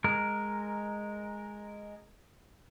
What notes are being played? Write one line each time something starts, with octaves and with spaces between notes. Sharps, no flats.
G#3 A#4